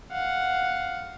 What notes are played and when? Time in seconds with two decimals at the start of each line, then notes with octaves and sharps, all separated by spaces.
0.11 F5 F#5